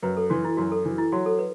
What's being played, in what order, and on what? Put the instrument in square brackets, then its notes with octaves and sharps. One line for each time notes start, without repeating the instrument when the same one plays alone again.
[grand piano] F#2 [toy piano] B4
[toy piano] A4
[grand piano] E3 [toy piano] F#4
[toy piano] E4
[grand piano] F#2 [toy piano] F#4
[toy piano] A4
[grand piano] E3
[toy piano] E4
[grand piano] F#3 [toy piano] F#4
[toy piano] A4
B4